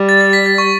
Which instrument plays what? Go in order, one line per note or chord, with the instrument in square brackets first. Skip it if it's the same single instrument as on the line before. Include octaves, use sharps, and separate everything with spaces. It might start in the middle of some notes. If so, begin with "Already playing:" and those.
Already playing: [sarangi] G3
[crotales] A6
A6
B6
A6
C#6